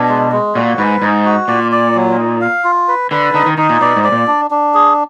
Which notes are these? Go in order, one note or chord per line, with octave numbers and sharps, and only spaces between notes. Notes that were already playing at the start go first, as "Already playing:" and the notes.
Already playing: B2 D4
G#3
G#3
A#2 F#4
G#2 B4
G#2 D#4
F#4
A#2 D5
D5
F#3
D#4
F5
F4
B4
D3 B4
D3 D#4
D#3
D#3 D#4
A#2
B2 D5
G#2
D5
A#2
D4
D4
G#4